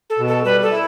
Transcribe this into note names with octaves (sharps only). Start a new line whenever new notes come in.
A4
B2
A4
G3 B4
A4
E4